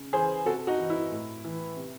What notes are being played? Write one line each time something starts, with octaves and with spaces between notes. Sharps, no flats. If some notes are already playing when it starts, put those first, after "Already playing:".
Already playing: C#3
E3 G#4 C5
C3 F#4 A4
D#4 F#4
E3
E4
A2
E3
C3